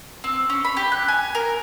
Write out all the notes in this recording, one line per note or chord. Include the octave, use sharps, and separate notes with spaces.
C4
C#4
B5
G4
F#6
G#5
A#4